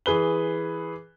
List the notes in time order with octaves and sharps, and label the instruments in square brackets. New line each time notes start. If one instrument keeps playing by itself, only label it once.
[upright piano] E3 G#4 B4 G7